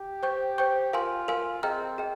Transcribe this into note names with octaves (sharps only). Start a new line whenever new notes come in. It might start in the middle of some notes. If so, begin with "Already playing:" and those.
Already playing: G4
C5 G5 C#6 G6
C5 G5 C#6 G6
F4 A#4 F5 G#5 C6
A#4 F5 G#5 C6
C4 G#4 D#5 G5 A#5 F6
G#4 D#5 G5